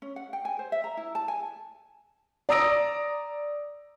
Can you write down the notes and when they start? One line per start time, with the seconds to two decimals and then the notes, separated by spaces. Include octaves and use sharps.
0.02 C#4
0.16 F#5
0.33 G5
0.45 G#5
0.59 C5
0.72 E5
0.84 A#5
0.97 E4
1.15 A5
1.28 G#5
2.49 D5 A#5 D#6 E6 A#6 D7